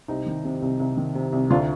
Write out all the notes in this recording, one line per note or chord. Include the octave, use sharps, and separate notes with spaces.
C2 C4 D#4
D#3
C3
C2
C2
D#3
C3
C2
D2 D4 F4